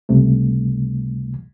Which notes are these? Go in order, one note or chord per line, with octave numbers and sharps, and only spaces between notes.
C#2 C3 G3 A3